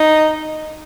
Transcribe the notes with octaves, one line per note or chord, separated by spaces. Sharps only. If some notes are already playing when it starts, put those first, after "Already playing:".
Already playing: D#4